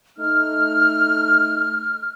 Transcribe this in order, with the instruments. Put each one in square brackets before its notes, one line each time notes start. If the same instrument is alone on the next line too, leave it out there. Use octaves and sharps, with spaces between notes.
[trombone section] A3 D#4 [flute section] F6